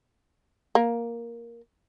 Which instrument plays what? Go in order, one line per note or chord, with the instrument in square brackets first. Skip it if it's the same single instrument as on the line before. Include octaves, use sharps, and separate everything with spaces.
[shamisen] A#3